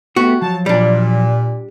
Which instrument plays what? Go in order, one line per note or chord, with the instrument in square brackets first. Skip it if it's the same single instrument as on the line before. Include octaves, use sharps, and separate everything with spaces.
[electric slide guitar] A3 B3 G4 [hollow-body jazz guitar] F#4
[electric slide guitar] F3 F#3 C#5 [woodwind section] A5
[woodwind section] A#2 [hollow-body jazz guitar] G3 D4